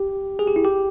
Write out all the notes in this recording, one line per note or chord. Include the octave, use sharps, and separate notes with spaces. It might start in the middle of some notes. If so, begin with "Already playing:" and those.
Already playing: G4
G#4
G4
E4
G4